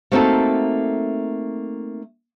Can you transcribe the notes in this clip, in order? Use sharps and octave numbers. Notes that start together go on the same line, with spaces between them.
A3 A#3 C4 D#4 F#4 A4